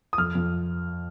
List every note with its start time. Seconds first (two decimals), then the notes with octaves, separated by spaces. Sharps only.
0.13 D#6
0.18 F2 F6
0.35 F2